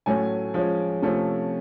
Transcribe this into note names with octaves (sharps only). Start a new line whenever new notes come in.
A2 F#3 A3 C#4 G#5
F3 G#3 C#4
C3 F3 A3 C#4